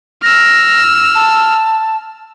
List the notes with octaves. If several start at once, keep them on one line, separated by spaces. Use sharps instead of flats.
E6 F6 A#6
A5